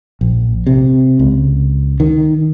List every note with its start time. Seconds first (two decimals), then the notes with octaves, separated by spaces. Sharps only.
0.21 A#1
0.67 C3
1.19 C#2
2.00 D#3